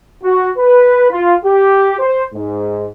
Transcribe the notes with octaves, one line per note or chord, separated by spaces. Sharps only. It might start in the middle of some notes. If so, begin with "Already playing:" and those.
F#4
B4
F4
G4
C5
G#2